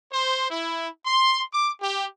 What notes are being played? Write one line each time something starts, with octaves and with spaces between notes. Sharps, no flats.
C5
E4
C6
D6
G4